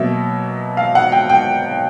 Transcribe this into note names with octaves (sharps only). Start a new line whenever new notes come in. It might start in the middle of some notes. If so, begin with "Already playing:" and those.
Already playing: B2 F#3 A#3 E5
F5
F#5
G5
G5